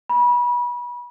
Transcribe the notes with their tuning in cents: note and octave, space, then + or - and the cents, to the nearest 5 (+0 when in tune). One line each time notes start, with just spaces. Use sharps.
B5 -30